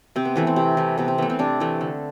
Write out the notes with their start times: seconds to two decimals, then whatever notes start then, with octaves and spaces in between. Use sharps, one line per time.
0.16 C3 C4
0.25 B3
0.36 E3 A3 B3
0.47 C4
0.56 C3
0.77 E3 A3
0.98 C3 B3
1.08 C4
1.18 E3 A3 B3
1.30 C4
1.39 C3 D4
1.60 E3 A3
1.81 D3